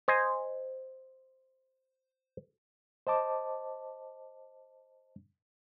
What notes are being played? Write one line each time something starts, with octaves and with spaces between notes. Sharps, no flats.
C5 D#5 G#5
C5 D#5 A5 D6